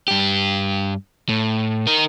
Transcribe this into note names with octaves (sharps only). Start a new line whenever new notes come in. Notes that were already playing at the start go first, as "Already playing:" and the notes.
G2 G4
A2
D#4 A#4